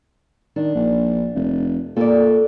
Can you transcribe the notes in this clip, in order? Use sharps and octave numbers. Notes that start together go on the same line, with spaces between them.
D#3 D4
A#1
F1
A#2 A4 D5